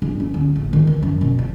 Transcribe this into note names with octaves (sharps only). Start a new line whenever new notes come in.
G2
C#4
D2
A1
D#3
E3
F#2
B2
F3